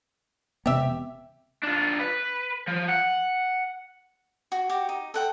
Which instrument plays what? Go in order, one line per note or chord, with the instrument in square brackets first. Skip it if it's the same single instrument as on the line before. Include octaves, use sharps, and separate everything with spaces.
[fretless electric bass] E1 C3 B3 [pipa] G4 E5
[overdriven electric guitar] D4 F4
B4
F3
F#5
[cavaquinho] F#4
F#4 G4
D#4
A4 F#5 G5